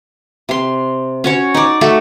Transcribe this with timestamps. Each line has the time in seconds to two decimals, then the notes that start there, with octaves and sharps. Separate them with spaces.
0.49 C3 C6
1.24 C#4 F#4 C#5
1.54 D#4 D5
1.81 A3 F#4 A4